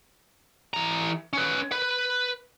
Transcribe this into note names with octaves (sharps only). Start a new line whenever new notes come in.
E3 A#5
C#4 B4
B4 B5